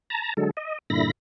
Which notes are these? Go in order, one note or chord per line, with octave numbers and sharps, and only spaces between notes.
A5 A#5
D3 F#3 G#3 A4
D#5
G2 A#2 D3 E4 B5 A#6